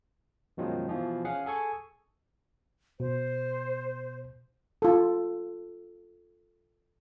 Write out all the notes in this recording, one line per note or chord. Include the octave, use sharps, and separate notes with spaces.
F#2 B2 D#3 F3 F#3 G#3
B2 E3 F3
C#4 G#4 F5 F#5
G#4 A4 G#5 C#6
B2 C5
F4 A4